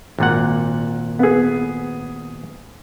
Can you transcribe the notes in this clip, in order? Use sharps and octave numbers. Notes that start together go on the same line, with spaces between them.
G#1 A#2 F#5
B3 G#4